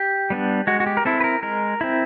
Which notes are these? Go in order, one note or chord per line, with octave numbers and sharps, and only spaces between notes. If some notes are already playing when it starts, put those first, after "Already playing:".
Already playing: G4
G3 B3 D4
G#3 F#4
F#4
G4
A#4
C4 E4 A4
B4
A#4
G#3 A#4
C4 E4